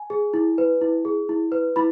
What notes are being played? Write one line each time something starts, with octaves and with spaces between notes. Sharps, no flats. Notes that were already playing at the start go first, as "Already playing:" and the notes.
Already playing: G#5
G#4
E4
B4
E4
G#4
E4
B4
E4 B5